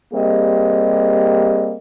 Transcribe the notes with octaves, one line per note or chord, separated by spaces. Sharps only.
G3 A#3 C4 G4 G#4 D#5